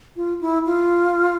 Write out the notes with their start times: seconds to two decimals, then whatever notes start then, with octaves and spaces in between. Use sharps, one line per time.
0.16 F4
0.41 E4
0.66 F4